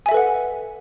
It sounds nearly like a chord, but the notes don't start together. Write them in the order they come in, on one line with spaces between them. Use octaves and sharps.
G#5 E5 A4 B4 F#5